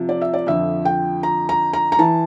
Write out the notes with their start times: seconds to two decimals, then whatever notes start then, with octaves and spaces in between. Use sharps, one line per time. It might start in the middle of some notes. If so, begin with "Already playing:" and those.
Already playing: C3 F3
0.09 D5
0.22 E5
0.34 D5
0.47 F2 D3 F3 E5
0.85 G5
1.23 A#5
1.49 A#5
1.73 A#5
1.92 A#5
1.99 E3 A5